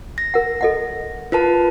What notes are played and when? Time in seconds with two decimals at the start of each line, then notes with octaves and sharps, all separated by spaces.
0.18 A#6
0.34 A#4 F#5
0.61 A4 D#5 F#5
1.32 F4 A#4 B4 A5